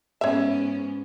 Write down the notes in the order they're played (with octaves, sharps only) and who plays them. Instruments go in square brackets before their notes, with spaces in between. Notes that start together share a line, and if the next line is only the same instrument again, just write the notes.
[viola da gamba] G#2 B3 C#4 [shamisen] C#5 E5